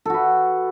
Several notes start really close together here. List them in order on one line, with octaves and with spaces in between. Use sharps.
A4 F#4 B4